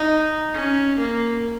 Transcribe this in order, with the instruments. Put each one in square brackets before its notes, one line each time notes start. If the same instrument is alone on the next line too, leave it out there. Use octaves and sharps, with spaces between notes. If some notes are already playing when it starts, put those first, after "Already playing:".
Already playing: [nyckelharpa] D#4
C#4
A#3